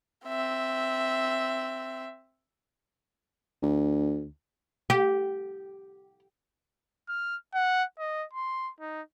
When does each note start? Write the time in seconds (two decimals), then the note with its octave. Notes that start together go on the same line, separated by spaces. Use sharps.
0.26 C4 E5
3.62 D2
4.90 G4
7.09 F6
7.54 F#5
7.99 D#5
8.33 C6
8.81 D#4